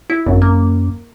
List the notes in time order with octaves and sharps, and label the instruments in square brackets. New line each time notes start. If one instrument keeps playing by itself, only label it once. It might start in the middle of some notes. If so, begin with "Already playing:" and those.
[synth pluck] E4
[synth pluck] G#1 [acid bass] F#2
[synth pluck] A#3